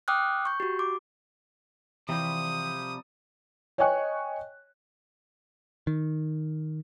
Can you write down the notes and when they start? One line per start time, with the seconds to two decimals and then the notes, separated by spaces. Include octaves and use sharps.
0.08 G5 D6 D#6 F6 F#6
0.45 C#6 G6
0.60 F#4 G4
0.79 D6
2.09 C3 E3 F3 G3 D#6
3.78 C#5 D#5 G5 G#5 C#6 F#6
5.87 D#3